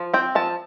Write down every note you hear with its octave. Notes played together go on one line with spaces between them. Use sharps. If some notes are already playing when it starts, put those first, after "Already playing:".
Already playing: F3
C4 G5
F3 A5